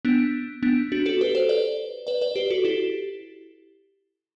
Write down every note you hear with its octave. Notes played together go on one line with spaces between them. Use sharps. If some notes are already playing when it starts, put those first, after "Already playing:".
B3 D4
B3 D4
D4 F#4
F#4 A4
G4 B4
A4 C5
B4 D5
B4 D5
B4 D5
G4 B4
F#4 A4
E4 G4